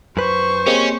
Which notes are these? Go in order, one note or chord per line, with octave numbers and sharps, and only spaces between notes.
F#2 B4 C5 C#6
A#3 C4 C#4 G4 G#4 C#5 D#5